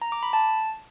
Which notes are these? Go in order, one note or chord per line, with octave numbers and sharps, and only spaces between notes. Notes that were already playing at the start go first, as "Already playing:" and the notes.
A#5
D6
B5
A5